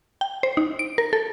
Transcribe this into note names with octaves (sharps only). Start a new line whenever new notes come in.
G5
C5
D#4
D7
A#4
A4